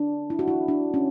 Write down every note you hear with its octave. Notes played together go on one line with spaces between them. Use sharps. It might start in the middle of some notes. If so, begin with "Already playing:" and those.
Already playing: D4
E4
F#4
E4
D4
C#4